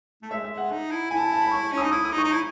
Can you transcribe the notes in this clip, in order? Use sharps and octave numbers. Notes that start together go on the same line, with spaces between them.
A3
G#3 E5
E5
G#3
F#5
D#4
E4
E4 G#5
A5
G#5
A5
B5
C#6
C#4
D#6
D#4
E4 D#6
D#6
D#4
C#6
D#4
E4